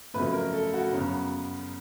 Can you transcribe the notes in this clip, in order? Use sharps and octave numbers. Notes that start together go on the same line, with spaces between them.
F2 C#3 F#3 A3 B4
A#4
A4
F#4
F#2 C#3 F#3 B3